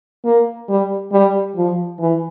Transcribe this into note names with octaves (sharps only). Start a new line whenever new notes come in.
A#3
G3
G3
F3
E3